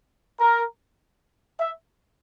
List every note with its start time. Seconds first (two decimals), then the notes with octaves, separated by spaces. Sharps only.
0.39 A#4
1.59 E5